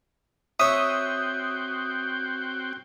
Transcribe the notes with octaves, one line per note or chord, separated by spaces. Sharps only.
C4 F#4 C#5 E5 G5 D#6